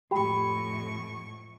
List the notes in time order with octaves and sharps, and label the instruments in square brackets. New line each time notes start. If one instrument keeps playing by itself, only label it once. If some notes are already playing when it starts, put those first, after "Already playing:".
[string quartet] F2 A2 C#6 [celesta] G4 G5 B5